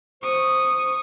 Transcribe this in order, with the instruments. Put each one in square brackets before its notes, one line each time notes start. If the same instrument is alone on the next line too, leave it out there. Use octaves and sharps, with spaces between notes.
[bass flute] C5 [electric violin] C#6 D#6